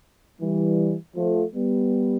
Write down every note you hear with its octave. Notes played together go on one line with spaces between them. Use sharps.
E3 G3
F3 A3
G3 B3